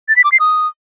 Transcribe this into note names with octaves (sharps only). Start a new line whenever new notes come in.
A6
B6
D6
C7
D#6